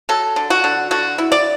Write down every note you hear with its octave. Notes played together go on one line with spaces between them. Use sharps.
F#3 A4
D3
F#4
D3
D3 F#4
E4
D5